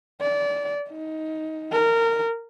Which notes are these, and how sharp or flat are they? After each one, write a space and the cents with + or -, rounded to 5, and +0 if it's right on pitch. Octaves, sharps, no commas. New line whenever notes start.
D5 -25
D#4 +15
A#4 -20